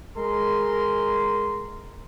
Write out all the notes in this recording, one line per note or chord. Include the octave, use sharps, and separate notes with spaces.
G#3 A#4 C6